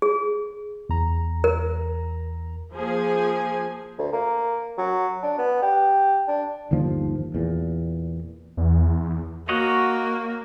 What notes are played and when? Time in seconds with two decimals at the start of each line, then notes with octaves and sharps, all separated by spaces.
0.02 G#4
0.89 E2 A#5
1.44 A#4
2.76 F3 A#3 G#4 G#5
3.99 D2
4.12 A#3
4.78 F#3
5.22 D4
5.38 B3
5.62 G4
6.28 D4
6.71 G1 D#2 D#3 F3
7.35 E2 A#2
8.57 E2
9.49 A#3 F#4 C#5 D#5 F#5